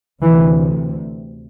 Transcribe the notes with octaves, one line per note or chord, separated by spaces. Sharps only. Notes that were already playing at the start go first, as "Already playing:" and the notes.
D2 C3 E3